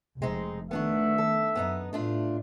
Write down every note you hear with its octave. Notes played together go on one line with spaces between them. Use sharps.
F1 G#3 C4 D#4
D#3 A3 B3 D4 F#4 E5
A4
F#2 B3 D4 D#4
A2 A3 D4 F4